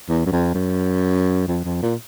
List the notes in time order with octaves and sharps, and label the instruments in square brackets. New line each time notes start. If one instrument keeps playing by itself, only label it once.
[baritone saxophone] E2
F#2
F2
F#2
F2
F2
A#2